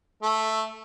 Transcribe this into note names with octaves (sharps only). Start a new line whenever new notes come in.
A3